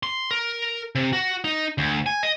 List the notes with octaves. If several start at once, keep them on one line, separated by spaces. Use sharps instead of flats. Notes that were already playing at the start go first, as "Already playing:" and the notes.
C6
A#4
C3
F#4
D#4
D2
G#5
D#5